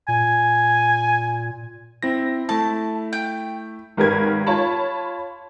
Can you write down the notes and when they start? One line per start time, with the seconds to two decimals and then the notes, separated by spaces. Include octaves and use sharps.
0.08 A#2 G#5
2.03 C4 E4 A#6
2.49 A3 E4 A5
3.13 G5
3.97 G#1 G4 A#4 B4 G#6
4.47 F4 C#5 A5 B5